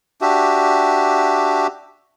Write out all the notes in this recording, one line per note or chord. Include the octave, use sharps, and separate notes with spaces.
D4 F#4 G4 E5